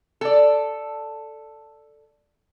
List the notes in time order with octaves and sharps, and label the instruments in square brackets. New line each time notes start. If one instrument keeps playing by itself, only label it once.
[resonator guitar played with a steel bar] A4 D5